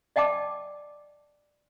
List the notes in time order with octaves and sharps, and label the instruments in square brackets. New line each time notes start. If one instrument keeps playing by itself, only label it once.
[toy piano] D5 D#5 G5 A5 D6